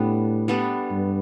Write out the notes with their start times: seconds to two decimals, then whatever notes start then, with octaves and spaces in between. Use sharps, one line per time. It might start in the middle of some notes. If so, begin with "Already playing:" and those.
Already playing: A2 G3 B3 D4
0.48 G3 B3 D4 A4
0.91 G2